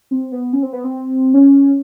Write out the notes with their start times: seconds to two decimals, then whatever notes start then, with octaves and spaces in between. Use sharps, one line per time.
0.11 C4
0.32 B3
0.53 C#4
0.63 C4
0.73 B3
0.84 C4
1.34 C#4